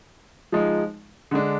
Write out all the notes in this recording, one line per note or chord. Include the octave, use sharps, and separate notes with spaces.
F3 G#3 D#4
D3 G#3 D4